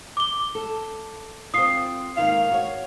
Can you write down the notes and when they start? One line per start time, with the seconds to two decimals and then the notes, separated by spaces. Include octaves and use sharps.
0.17 D6 G7
0.55 A4
1.54 C4 F4 D#6 C7
2.17 G#2 D#3 A#3 F5
2.51 F#4 C#5